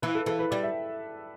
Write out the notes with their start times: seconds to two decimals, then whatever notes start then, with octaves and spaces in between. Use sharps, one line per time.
0.02 E3 B4
0.15 A4
0.26 E3 A4
0.39 B4
0.51 G3 D5
0.63 E5